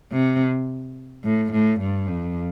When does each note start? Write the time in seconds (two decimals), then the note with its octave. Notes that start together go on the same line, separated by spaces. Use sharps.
0.12 C3
1.24 A2
1.52 A2
1.80 G2
2.08 F2